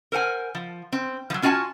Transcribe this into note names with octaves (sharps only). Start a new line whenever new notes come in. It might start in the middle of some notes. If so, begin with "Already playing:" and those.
A#4 C5 F#5 G#5
F3
C4
F3 F#3
C#4 F4 F#4 F5 G#5 A5